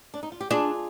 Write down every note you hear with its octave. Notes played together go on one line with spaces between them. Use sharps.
D4
D#4
F4
G4
D4 F4 G#4